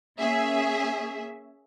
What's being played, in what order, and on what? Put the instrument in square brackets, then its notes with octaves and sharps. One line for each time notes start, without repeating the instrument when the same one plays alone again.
[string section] A#3 C#4 G#4 E5